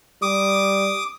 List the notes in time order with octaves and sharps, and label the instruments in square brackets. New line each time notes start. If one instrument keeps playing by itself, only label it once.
[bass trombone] G3 [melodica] D6 D#6